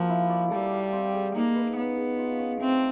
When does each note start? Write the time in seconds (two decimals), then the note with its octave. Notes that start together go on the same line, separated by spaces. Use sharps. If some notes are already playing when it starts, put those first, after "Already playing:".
Already playing: F3 A#3 F#4
0.09 E4
0.30 D5
0.51 G3 A4
0.72 F5
0.93 C4
1.13 G#4
1.35 A#3 D#4
1.56 B4
1.76 B3 C#4
1.97 G#4
2.18 F4
2.39 C#4
2.60 A3 C4